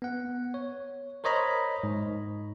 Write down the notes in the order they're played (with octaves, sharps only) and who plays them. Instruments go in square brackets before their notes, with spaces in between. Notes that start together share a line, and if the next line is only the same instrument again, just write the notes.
[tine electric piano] B3 F#5
C#5
A#4 C5 C#5 D#5 A#5 B5
G#2